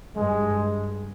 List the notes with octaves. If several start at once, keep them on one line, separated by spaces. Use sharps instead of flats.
G2 G#3